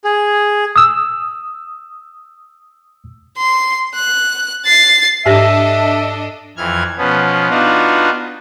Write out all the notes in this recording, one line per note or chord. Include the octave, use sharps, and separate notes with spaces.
G#4
D#6 E6
C6
F#6
A6 C7
G#2 D4 G4 A4 D#5 E5 A#6
F2 E3 F6 G#6
B2 F3 B3 C#4
B3 D4 D#4 F4 F#4